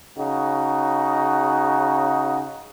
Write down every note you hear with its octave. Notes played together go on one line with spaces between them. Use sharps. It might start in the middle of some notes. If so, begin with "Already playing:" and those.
C#3 D#4 F#4